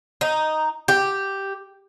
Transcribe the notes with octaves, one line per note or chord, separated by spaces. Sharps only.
D#4
G4